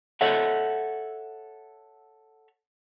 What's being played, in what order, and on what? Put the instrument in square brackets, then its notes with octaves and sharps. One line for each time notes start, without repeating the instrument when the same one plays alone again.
[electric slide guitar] A4 C#5 E5 F#5